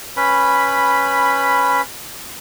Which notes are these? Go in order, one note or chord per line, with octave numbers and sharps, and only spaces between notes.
C#4 B4 B5